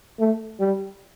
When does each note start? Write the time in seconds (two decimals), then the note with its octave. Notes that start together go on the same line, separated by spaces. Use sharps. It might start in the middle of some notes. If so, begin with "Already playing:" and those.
0.20 A3
0.60 G3